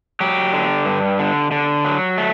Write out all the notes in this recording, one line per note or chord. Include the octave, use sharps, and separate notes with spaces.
F#3 G4
D3
G2
D3
D3
F#3
A3